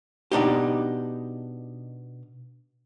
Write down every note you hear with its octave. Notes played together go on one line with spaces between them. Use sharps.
B2 D4 D#4 G4